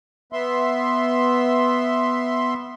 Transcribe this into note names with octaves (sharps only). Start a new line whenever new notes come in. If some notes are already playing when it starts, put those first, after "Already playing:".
B3 E5 C6